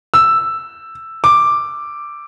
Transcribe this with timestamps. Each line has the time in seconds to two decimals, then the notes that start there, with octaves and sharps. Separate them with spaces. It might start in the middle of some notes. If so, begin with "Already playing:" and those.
0.14 E6
1.24 D6